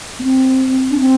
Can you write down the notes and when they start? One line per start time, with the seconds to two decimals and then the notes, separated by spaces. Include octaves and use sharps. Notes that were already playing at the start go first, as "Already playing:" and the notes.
0.19 B3
0.23 C4
0.91 D4
1.00 C4